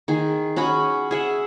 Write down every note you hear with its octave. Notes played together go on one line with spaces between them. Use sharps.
D#3 G#4
C#4 F#4 G#4 B5
G#4 E5 F#5